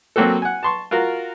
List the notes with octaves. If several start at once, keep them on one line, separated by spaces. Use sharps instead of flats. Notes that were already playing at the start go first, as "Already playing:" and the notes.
F#3 A#3 C4 F#4 A4
F#5 G#5
A5 C6 C#6
F4 F#4 A#4